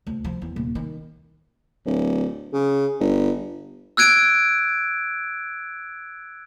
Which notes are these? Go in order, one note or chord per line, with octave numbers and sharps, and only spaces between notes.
D2
F3
E2
D#1
D#3
D1
C#3
G1
E6 F#6 G#6 D7 D#7